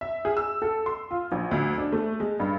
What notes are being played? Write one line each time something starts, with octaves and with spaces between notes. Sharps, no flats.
E5
G#4
E6
A4
C6
F4
A#1
D2
D4
A3
G#3
G2